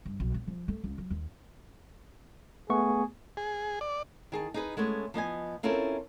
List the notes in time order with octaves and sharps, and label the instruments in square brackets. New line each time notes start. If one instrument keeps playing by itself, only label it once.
[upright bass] G2
B1
B3
F3
A3
C#2
F#3
D#2
[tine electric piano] A3 B3 C#6 [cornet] G#4
[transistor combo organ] G#4
D5
[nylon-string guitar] D#3 G#4 A5
D#4 G#4 B4
G#3 A3 B3 C#4
F3 B3 D#5 G#5
C4 C#4 E4 F4 A4 A#4